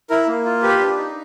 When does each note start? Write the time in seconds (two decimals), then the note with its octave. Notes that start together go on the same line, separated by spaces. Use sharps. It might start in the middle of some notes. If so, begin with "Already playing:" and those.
0.10 E4 A#4
0.27 A#3
0.45 F4
0.62 G4 B4
0.80 D4
0.97 D#4